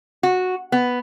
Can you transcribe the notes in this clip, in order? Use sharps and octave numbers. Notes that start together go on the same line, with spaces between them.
F#4
B3